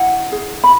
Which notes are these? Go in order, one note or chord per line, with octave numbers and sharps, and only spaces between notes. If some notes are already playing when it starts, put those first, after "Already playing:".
Already playing: E4 F#5
G#4
B5